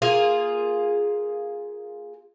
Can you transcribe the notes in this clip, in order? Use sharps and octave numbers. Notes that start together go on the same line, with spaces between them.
A#3 F4 G#4